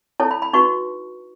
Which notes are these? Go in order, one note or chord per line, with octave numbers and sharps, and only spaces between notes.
E4 A4 C#5 A5
B5
B5
D#4 F#4 B4 C#6